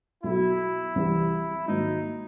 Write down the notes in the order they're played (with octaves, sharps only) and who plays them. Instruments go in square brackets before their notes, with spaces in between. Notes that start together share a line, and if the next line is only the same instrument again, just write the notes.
[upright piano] B1 B2 F#3 [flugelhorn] E4
[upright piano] C2 C3 E3 G3
[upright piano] G#2 D#3 F#3 A#3 [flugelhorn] D#4